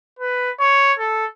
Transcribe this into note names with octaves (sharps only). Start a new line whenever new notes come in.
B4
C#5
A4